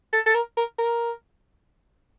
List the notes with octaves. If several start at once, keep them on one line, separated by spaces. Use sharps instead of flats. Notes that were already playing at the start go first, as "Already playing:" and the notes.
A4
A4
A#4
A#4
A#4